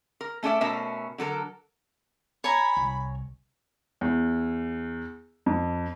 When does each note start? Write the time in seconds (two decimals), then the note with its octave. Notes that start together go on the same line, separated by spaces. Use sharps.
0.21 A#4
0.43 A3 C#4 A4 D5 E5
0.61 B2 A3 C#4 A#4 E5
1.18 D3 F#3 A4 A#4
2.44 C#5 G#5 A#5 B5
2.77 C2
4.01 E2
5.46 F2